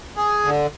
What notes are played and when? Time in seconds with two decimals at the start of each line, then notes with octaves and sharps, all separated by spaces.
0.17 G#4
0.44 D3